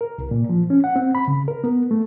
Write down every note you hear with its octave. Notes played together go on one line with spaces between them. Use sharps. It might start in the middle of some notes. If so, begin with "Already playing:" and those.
A#4
C2
A#2
F3
C#4
F#5
C4
B5
C#3
A#4
B3
A3